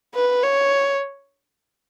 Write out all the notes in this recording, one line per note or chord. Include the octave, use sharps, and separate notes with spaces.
B4
C#5